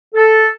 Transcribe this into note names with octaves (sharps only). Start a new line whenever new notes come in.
A4